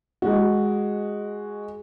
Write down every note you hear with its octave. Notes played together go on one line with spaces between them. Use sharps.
G#3 F#4